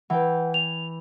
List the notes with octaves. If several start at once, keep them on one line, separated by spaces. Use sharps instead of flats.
E3 B4 F#5 G5
F7